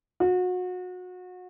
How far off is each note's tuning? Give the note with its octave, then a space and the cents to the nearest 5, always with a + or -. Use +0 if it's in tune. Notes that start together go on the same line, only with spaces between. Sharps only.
F#4 -30